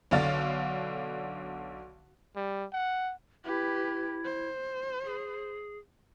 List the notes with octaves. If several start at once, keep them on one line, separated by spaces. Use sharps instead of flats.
B1 D3 F5 A6
G3
F#5
E4 G4 B4
C5
G#4